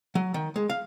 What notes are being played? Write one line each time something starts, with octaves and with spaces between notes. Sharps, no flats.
F#3
D#3
G#3
F5